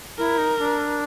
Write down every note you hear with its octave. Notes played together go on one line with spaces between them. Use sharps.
E4 A#4
D#4
D4